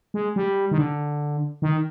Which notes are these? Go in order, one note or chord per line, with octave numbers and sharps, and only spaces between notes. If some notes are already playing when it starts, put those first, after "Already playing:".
G#3
G3
D#3
D3
D#3